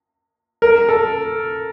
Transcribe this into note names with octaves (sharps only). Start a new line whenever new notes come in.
A#4
A4